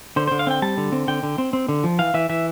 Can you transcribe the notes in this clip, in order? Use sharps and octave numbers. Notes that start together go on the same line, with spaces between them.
D3 C5
D3 C5
F5
C4 G5
G3 A5
D3
C4
D3 G5
D3
C4
C4
D3
F3
E3 F5
E3 E5
E3 E5